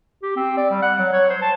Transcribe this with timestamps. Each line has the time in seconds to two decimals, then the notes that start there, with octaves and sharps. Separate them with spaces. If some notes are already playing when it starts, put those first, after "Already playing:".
0.23 G4
0.36 C4
0.57 D5
0.70 G3
0.82 F#5
0.98 F#3
1.13 C#5
1.30 C5
1.42 A5